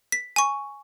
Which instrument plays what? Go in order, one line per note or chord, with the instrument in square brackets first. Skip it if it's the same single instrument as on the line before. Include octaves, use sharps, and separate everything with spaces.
[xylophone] B6
G#5 C#6